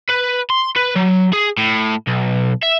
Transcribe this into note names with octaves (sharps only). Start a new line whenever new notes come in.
B4
C6
B4
F#3
G#4
A2
B1
E5